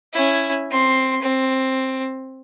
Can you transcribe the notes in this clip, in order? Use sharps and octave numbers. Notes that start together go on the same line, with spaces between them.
C#4 E4
C4 C6
C4